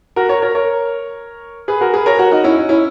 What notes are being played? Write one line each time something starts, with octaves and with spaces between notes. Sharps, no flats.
F#4 A#4
A#4 C#5
A#4 C#5
A#4 C#5
G#4 B4
F#4 A#4
G#4 B4
A#4 C#5
F#4 A#4
D#4 F#4
C#4 E4
D#4
C#4 E4